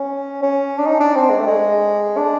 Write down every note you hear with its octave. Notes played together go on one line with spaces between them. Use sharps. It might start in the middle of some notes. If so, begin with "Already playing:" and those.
Already playing: C#4
C#4
D4
D#4
D4
C4
G#3
A3
G#3
D4